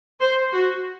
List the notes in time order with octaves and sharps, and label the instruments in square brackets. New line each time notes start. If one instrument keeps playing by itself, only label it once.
[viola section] C5
F#4